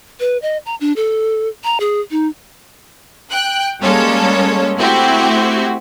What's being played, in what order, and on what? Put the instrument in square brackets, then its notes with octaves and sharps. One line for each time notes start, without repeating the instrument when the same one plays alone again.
[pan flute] B4
D#5
A#5
D4
A4
A#5
G#4
D#4
[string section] G5 F#6
G3 G#3 A#3 C#4 A4 C#5
A3 C4 E4 F#4 G4